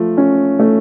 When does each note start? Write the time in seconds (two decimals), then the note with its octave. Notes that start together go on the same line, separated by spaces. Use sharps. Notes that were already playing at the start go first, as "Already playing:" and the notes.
Already playing: F3 A3
0.18 C#4
0.59 A3